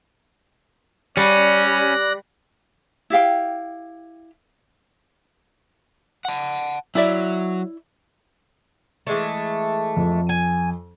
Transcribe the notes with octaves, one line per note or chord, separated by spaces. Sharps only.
G3 C#4 D5 F#6 A#6
E4 G4 F5 G5
F#5 A5
F#3 E4 D5 E5
E3 G#3 A3
F2
G#5